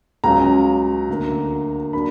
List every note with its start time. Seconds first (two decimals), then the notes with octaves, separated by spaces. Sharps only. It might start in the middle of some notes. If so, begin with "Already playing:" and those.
0.24 C#2 C#3 F#3 C#4 A#5
1.09 D2 D3 A#3
1.93 F#3 A#3 D4 B5